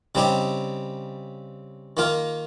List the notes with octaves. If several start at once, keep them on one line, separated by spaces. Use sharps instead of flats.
C#3 G3 C4 D#4 G4
D#3 A#3 F4 A#4